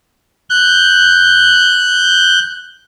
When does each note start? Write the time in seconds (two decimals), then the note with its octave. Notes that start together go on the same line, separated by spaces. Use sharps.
0.50 F#6 G6